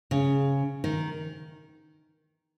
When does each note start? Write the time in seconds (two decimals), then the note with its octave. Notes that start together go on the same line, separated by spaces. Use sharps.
0.11 C#3
0.84 D#3